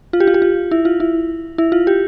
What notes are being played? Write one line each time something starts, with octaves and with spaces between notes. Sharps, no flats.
F4
G4
F4
G4
F4
E4
F4
E4
E4
F4
G4